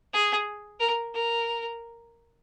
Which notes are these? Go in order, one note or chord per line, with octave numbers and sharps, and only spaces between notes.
G#4
A#4
A#4